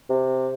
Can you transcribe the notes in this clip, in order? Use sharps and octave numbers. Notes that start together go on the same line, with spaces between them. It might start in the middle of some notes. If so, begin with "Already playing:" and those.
C3